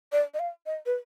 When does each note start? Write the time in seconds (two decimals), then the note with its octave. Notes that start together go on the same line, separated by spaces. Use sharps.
0.12 D5
0.34 D#5
0.39 F5
0.66 D#5
0.86 B4